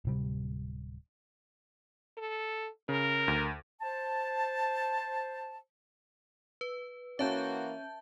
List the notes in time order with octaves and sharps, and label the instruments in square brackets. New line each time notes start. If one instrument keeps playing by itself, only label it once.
[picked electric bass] D1 C3 G3
[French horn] A4
[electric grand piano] C#3 [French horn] A#4
[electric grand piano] D2
[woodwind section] C5 A5
[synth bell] B4
[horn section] E3 A#3 F#4 [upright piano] C#4 [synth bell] E5 A5 G6